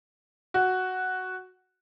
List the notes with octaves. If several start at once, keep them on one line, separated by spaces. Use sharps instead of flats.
F#4